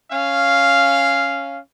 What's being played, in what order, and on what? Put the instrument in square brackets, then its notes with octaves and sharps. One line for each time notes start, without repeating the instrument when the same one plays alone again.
[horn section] C#4 F5